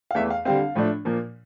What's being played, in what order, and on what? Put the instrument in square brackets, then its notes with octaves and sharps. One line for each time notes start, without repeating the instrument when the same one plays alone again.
[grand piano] F5
E2 E3 A3 E5
F5
D3 G3 C4 F5
A2 F3 A3 D4
A#2 F3 A#3